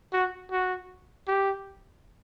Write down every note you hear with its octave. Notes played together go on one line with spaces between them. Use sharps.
F#4
F#4
G4